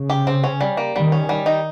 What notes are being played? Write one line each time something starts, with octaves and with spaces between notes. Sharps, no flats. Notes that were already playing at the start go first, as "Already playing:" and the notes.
Already playing: C#3
G4
C4
C#4
G3
A#3
D#3 G3
C#4
G3
D#4